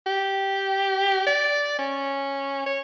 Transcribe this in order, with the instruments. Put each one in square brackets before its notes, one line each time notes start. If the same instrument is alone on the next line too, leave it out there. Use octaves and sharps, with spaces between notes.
[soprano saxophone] G4
D5
C#4
C#5